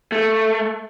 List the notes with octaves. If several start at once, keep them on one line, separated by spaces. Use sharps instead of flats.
A3